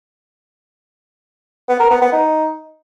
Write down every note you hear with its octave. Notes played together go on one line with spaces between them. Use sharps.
B3
A#4
B3
B3
D#4